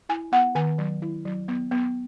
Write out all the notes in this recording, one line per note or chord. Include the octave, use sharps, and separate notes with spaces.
E4 G#5
B3 F#5
D#3 G#5
F#3
E4
F#3
B3
B3